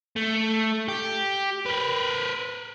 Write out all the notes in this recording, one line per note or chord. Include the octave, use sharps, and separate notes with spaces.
A3
G4
A#4 B4